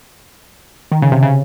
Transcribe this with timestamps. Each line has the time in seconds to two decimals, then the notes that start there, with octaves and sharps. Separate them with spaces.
0.92 D#3
1.02 C#3
1.12 C3
1.23 C#3